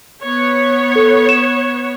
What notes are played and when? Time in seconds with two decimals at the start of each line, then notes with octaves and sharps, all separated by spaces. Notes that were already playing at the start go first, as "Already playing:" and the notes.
0.24 B3 C#5
0.96 A4
1.29 E7